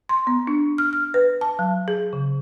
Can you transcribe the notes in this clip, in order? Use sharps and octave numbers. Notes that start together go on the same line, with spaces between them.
C6
B3
D4
F6
F6
B4
A5
F#3
G#4
C#3